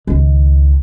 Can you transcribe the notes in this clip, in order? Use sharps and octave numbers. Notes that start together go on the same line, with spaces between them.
C#2 D#3